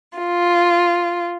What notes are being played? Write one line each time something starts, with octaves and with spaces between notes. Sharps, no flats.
F4